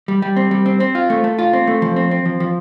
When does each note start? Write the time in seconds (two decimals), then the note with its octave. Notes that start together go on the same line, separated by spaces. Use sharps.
0.08 G3
0.22 G3
0.36 C4
0.51 G3
0.66 C4
0.80 C4
0.95 F4
1.10 A3
1.24 A3
1.39 F4
1.53 C4
1.67 A3
1.82 F3
1.96 C4
2.11 C4
2.26 F3
2.40 F3